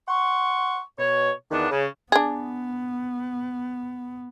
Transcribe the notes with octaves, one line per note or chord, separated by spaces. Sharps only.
F#5 C6 C#6
B2 C#5
E2 D#3 B3 D4
C#3
B3 D4 G#4